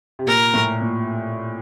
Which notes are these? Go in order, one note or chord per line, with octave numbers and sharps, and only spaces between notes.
C3
A#2 A#4
A2
A#2